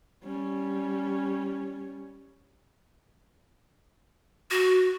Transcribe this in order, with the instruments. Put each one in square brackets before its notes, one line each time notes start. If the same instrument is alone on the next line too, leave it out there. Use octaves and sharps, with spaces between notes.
[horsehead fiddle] G3 C#4
[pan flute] F#4